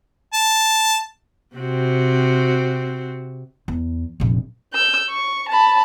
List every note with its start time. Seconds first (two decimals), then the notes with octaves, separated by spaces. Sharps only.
0.34 A5
1.56 C3 C4 F#4
3.68 E2
4.20 F1 A#1
4.73 E6 G6
5.10 C#6
5.49 A5 B5